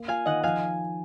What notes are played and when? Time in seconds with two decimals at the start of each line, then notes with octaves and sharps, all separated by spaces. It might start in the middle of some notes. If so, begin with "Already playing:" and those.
Already playing: A#3
0.08 F4 F5 G#5
0.26 D#3 D#5 F#5
0.43 F3 F5 G#5